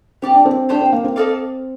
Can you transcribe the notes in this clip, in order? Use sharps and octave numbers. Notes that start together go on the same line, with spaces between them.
C4 G4 D5 A5
D4
C4
D4 G4 C5 G5
C4
A#3
C4
D#4 A4 D5 F5